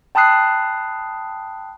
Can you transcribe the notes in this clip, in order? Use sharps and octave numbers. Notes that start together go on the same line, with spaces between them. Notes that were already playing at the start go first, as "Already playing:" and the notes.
G5 A5 B5 D#6 F#6 C7